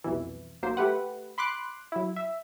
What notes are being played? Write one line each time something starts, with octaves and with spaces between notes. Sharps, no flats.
C2 F2 B2 E3
B1 F#3 A#3 C5
A3 G4 B4 F#5
B5 C6 D6 F#6
F#3 E4
E5